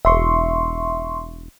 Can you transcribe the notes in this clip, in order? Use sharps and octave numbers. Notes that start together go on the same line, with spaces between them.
E1 E5 C6 C#6